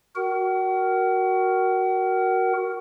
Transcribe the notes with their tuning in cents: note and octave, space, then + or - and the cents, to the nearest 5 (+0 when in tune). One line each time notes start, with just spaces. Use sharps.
F#4 +0 A#4 +0 F#5 +45